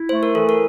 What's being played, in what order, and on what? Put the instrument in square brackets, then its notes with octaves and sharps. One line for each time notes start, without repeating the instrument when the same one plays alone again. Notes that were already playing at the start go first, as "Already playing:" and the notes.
Already playing: [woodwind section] E4
[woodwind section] A3 [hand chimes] C5
[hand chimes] A#4
[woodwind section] E3 [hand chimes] A4
[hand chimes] A#4